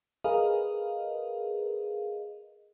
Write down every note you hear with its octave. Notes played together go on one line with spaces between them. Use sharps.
G#4 A#4 B4 D#5 F5